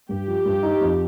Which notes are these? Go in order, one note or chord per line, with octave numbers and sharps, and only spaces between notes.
G2 G4
F3
G2
D#4
F2